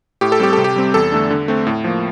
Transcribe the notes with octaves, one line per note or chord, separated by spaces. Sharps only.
A2 G4
A4
G3 C4 G4
C3 A4
G4
G3 C4
E2 A4
D3 A3 D4
D3
A3 C4
A2
F3 A#3